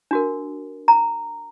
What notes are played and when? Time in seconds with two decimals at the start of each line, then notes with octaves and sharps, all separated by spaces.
0.11 D4 F#4 A#4
0.88 A#5